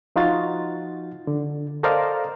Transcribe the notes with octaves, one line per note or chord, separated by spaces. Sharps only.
F3 D#4 F4 F#4 A6
D3
A4 A#4 C5 D5 D#5 F5